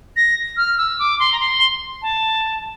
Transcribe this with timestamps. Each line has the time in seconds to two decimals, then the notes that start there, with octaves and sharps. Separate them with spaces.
0.17 A#6
0.57 F6
0.78 E6
0.99 D6
1.20 C6
1.32 A#5
1.40 C6
2.02 A5